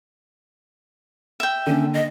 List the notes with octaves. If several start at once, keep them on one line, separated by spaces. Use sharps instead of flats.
E5 G5
D3 A#3 C#4 D4
D#5